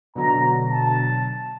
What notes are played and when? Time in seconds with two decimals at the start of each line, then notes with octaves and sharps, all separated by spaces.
0.15 B2 D3 F#3 A#5
0.68 A5